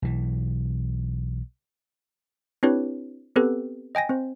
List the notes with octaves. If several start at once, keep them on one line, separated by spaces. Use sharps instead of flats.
B1 E3
C4 D4 E4 G4 B4 C#5
B3 C4 G4 A4 B4
D#5 G5 G#5 A#6
C4 C5